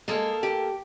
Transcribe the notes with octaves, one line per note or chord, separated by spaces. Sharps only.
G#3 A#3 A4 A#4
G4